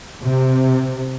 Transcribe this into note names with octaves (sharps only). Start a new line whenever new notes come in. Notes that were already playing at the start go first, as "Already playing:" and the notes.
C3